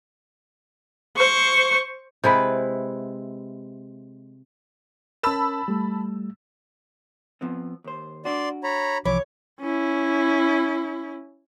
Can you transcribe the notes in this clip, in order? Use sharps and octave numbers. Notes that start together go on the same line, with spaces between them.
C5 C#6
C3 G#3 E4 B4
C#4 A#4 A5 B5 E6
G3 A3
F3 B3 C4
D#2 C5
D4 F#4 D5 C6
C#5 A#5 B5
C2 E3 F3 C#5 B5 D6
C#4 E4